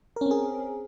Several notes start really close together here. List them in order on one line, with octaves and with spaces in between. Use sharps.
A#4 C#4 C4 G#4